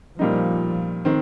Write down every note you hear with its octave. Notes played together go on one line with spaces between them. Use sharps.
A#2 F3 G3 D#4
D#3 C4